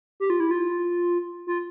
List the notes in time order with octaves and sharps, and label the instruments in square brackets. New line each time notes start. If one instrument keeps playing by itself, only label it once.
[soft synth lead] G4
F4
E4
F4
F4